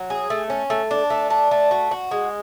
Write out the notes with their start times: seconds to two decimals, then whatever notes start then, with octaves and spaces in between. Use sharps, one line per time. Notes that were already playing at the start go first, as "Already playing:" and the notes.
Already playing: F#3
0.10 G#4
0.30 A3
0.50 C#4
0.70 A3
0.91 D4
1.10 A3
1.30 D4
1.51 A3
1.71 F#4
1.91 F#4
2.11 G#3